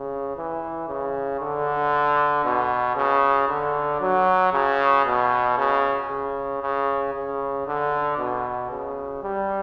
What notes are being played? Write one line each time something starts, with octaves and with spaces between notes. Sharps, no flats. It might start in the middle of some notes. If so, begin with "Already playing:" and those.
Already playing: C#3
E3
C#3
D3
B2
C#3
D3
F#3
C#3
B2
C#3
C#3
C#3
C#3
D3
B2
C#3
G3